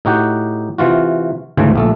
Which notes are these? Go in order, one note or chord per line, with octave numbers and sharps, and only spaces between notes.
A2 D#4 F#4 G4 F#5
C3 E3 F4 F#4
D2 G#2 C#3 E3 A3 C4
A#1 A3 A4